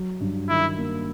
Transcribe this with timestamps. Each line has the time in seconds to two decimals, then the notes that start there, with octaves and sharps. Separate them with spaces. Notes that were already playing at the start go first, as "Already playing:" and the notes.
Already playing: F#3
0.20 G2
0.49 D#3 E4
0.78 A#3